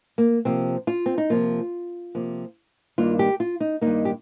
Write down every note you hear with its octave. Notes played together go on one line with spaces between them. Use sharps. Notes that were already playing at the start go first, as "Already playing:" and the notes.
A#3
C3 F3 A#3 C4
F4
C4
D#4
C3 F3 A#3 F4
C3 F3 A#3
G2 D#3 A#3 F4
G4
F4
D#4
G2 D#3 A#3 D#4
G4